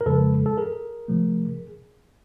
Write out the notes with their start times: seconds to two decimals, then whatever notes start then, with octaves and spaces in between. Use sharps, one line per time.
0.01 A#4
0.06 F2 C#3 F3 G#3 A4 B4
0.46 A4
0.58 G#4 A#4
1.08 C3 F3 A3